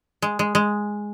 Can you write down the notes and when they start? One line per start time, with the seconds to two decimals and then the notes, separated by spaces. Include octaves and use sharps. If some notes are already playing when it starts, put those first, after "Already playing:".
0.22 G#3
0.39 G#3
0.55 G#3